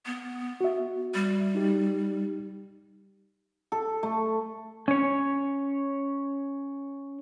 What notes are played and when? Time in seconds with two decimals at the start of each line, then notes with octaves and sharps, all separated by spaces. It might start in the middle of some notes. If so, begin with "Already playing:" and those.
0.06 B3
0.61 F#4 E5
1.15 G3
1.55 D#4 G4
3.72 A4
4.03 A3
4.88 C#4 C#5